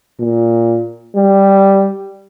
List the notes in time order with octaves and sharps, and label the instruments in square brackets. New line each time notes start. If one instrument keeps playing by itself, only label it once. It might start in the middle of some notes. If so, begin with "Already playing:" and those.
[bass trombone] A#2
G3